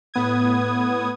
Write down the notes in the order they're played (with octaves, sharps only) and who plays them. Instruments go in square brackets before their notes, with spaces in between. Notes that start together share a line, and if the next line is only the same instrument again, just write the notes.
[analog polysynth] A2 B3 D#6 G#6